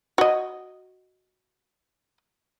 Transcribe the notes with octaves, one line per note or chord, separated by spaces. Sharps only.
F#4 D#5